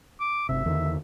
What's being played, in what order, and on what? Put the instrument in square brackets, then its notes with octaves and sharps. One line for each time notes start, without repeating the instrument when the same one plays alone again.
[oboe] D6
[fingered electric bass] G1 C3 [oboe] E5
[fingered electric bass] E2 D3 D#3